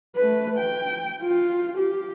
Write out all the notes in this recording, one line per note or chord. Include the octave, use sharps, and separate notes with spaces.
A3 B4
G5
F4
G4